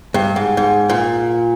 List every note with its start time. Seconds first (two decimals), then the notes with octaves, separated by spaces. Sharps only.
0.14 G2
0.36 G#2
0.57 G#2
0.90 A#2